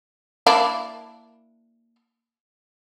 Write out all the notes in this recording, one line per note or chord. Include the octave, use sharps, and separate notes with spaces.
A#3 D4 E4